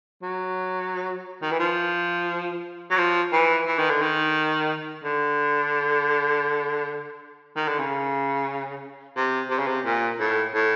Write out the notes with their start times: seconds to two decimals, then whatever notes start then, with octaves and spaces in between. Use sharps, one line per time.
0.22 F#3
1.42 D#3
1.52 E3
1.60 F3
2.91 F#3
2.98 F3
3.33 E3
3.67 E3
3.78 D#3
3.90 D3
4.02 D#3
5.04 D3
7.56 D#3
7.68 D3
7.79 C#3
9.17 C3
9.50 C3
9.59 C#3
9.67 C3
9.85 A#2
10.20 A2
10.54 A2